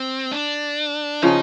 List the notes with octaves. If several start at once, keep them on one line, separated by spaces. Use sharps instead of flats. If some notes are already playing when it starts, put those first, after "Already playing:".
Already playing: C4
D4
C#3 F3 D#4